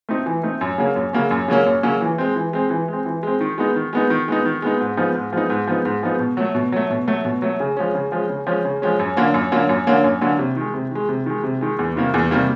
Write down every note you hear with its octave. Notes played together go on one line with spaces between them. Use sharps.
A3 C4 D#4
E3
A3 C4 D#4
F#2
C#3 F#3 A#3 C#4
F#2
C#3 F#3 A#3 C#4
F#2
C#3 F#3 A#3 C#4
F#2
C#3 F#3 A#3 C#4
E3
G#3 C4
E3
G#3 C4
E3
G#3 C4
E3
G#3 C4
D#3
G#3 B3 D#4
D#3
G#3 B3 D#4
D#3
G#3 B3 D#4
D#3
G#3 B3 D#4
G#2
F3 G#3 B3 D#4
G#2
F3 G#3 B3 D#4
G#2
F3 G#3 B3 D#4
G#2
F3 G#3 B3 D#4
B2
F#3 A3
B2
F#3 A3
B2
F#3 A3
B2
F#3 A3
C#3
F3 G#3 C#4
C#3
F3 G#3 C#4
C#3
F3 G#3 C#4
C#3
F3 G#3 C#4
F#2
D3 F#3 A#3 C#4
F#2
D3 F#3 A#3 C#4
F#2
D3 F#3 A#3 C#4
F#2
D3 F#3 A#3 C#4
C3
D#3 G#3
C3
D#3 G#3
C3
D#3 G#3
C3
D#3 G#3
E2
C3 D#3 G3 A#3
E2
C3 D#3 G3 A#3